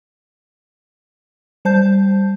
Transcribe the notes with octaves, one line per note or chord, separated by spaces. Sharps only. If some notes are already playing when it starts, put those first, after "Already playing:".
G3 C5 A5 G6